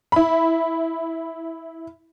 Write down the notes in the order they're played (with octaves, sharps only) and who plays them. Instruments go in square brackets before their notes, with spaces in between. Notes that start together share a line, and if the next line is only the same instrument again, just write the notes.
[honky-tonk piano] E4 B5